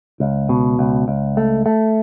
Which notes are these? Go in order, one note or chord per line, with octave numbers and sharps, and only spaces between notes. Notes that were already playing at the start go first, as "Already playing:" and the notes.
C#2
B2
C#2
C#2
A3
A3